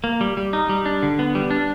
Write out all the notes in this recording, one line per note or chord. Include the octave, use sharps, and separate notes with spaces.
A#3
G3
G3
D#4
G3
D4
D3
B3
G3
D4